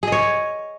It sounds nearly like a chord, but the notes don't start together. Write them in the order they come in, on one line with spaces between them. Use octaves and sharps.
G#4 D#5 C#5